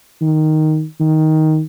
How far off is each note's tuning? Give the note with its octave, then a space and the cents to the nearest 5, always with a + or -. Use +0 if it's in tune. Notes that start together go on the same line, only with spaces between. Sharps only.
D#3 +0
D#3 +10